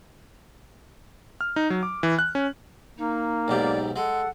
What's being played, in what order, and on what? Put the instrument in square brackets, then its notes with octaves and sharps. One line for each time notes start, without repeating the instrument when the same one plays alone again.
[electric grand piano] F6
D#4
F#3
D6
E3
F#6
C#4
[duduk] A#3 [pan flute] D#4
[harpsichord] B1 G#2 G4 [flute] D5
[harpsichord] G#3 [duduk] A4 [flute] F#5